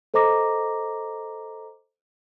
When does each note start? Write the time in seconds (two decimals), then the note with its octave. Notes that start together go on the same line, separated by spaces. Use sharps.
0.14 A4 C5 D#5 A#5 D6 A#6